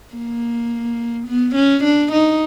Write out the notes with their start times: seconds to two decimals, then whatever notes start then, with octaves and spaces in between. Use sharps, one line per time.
0.15 A#3
1.27 B3
1.55 C#4
1.84 D4
2.12 D#4